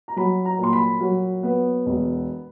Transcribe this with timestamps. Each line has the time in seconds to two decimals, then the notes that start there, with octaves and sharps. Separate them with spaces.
0.08 A#5
0.16 F#3 B5
0.45 A#5
0.59 A#2 C6
0.73 B5
1.01 F#3
1.43 B3
1.86 E1